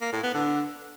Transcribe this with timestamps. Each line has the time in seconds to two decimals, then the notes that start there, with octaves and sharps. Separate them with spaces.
0.01 A#3
0.12 A2
0.23 B3
0.34 D3